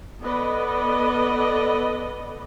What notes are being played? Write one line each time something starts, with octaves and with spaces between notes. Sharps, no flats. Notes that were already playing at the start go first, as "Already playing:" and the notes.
B3 A4 B4 D5 D#5